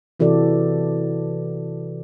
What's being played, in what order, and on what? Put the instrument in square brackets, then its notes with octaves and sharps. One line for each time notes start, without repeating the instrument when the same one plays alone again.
[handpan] C3 E3 F#4 A4 D5